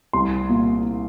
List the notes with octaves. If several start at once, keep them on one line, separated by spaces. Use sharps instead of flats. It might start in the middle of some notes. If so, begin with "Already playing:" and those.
C2 C6
A#2